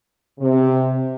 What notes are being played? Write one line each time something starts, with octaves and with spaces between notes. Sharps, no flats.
C3